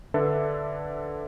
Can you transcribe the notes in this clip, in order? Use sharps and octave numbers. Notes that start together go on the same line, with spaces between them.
D3 D4 A4 B4 E5